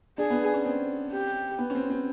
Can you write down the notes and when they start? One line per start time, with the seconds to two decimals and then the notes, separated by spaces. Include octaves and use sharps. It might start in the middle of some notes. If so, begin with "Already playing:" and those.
0.18 D4 G#4
0.30 B3
0.54 C#4
0.65 C4
1.12 G4
1.58 B3
1.70 C#4
1.75 C4
1.90 C4